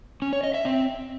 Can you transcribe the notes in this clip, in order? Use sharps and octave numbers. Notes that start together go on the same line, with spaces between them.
C#4
C#5
D#5
E5
C4